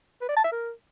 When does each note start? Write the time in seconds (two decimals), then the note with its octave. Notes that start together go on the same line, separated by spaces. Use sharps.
0.21 B4
0.29 D5
0.36 A5
0.44 E5
0.52 A#4